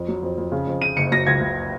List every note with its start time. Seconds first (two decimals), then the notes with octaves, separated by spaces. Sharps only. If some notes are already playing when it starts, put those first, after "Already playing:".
Already playing: F2
0.08 F#3
0.23 F2
0.38 F2
0.52 C#3
0.67 F2
0.81 C#3 D#7
0.96 F#1 C#7
1.12 F#3 A#6
1.27 C#2 G#6
1.41 C#2